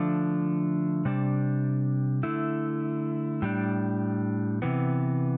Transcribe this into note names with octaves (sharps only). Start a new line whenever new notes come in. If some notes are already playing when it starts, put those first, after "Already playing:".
Already playing: D3 F3 A3 D4
C3 G3 D4
D3 A3 E4
A2 G3 D4
C3 E3 B3